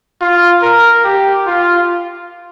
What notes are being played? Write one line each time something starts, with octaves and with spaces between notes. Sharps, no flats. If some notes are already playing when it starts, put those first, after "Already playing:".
F4
A#4
G4
F4